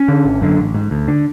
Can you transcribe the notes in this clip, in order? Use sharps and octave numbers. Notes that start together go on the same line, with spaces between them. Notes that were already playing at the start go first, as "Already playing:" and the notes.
Already playing: C#4
D3
G#1
F#2 D3
A1
G#2
D2
D3